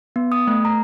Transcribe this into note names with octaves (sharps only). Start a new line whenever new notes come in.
B3
D#6
A3
A#5